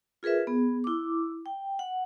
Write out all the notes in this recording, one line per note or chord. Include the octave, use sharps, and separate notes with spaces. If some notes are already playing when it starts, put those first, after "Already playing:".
F4 G#4 A#4 B4 E5
B3 G#4
E4 D6
G5
F#5